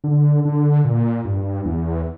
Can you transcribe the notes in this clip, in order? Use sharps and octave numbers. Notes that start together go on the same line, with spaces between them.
D3
D3
A#2
G2
E2